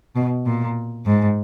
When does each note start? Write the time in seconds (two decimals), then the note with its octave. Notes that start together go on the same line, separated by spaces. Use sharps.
0.16 B2
0.46 A#2
1.06 G#2